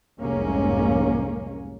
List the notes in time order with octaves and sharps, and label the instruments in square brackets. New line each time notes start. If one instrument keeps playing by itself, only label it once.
[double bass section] F1 C2 G#2 G#3 A#3 C#4